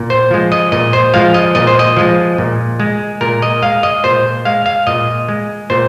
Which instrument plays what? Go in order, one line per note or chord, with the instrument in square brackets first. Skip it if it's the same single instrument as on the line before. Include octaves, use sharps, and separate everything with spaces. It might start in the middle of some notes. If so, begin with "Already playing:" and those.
Already playing: [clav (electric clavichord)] A#2
C5
F3 G#3
D#5
A#2 D#5
C5
F3 G#3 F5
D#5
A#2 D#5
C5
D#5
F3 G#3
A#2
G#3
A#2 A#4
D#5
G#3 F5
D#5
A#2 C5
G#3 F5
F5
A#2 D#5
G#3
A#2 C5